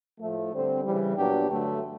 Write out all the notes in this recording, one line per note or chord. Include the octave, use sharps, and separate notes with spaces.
A2 F3 A3
D3 G3 C4
C#3 E3 G3
A#2 F#3 B3 D4 G4
G2 D3 F#3 A3